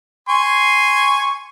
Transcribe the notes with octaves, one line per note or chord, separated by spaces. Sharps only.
G#5 C6 C#6